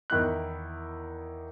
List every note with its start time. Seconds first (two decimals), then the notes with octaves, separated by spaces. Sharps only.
0.10 E2 D#3 E4 F#6